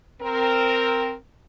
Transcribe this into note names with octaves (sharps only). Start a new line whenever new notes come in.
C4 A#4